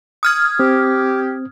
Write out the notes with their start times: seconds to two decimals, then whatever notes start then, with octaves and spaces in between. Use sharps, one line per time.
0.23 D#6 F6 G#6
0.60 C4 G4